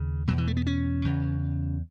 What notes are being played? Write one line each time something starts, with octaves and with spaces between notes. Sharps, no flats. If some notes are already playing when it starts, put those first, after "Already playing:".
Already playing: D#2 C#3
E2 B2 F#3
E3
A3
B3
C#4
E2 C#3